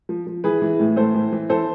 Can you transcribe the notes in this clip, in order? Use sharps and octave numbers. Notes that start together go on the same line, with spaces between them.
F3
F3
E3 G#4 B4
E3
A2
A2 A4 C5
E3
E3
E3 A4 C5